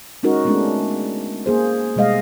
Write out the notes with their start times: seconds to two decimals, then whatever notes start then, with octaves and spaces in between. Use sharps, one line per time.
0.23 G#3 C#4 D#4 F#4 A#4
0.45 G#3 A3 B3 C#4 D4
1.46 A#3 G#4 C5
1.96 B2 G3 G#3 D#5 F5